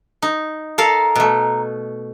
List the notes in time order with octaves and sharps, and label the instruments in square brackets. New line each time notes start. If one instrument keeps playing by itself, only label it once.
[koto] D#4
[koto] A4 A#4 F5 [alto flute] A#5
[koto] B2 A3